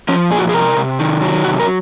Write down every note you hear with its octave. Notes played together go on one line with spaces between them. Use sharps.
F3 C#4
A#2 G#4
F#4
G#4
C3 A#4
C3
D#3
F#3
C3 F#4
A#4